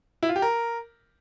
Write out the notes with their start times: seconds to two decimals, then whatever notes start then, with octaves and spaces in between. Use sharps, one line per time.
0.23 E4
0.29 F4
0.36 G4
0.42 A#4